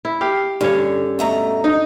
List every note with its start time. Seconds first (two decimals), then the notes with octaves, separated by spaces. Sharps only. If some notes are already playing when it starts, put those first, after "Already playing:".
0.05 E4
0.21 G4 F5
0.61 G2 D3 C#4 C#5
1.19 B2 A3 A#5
1.64 D#4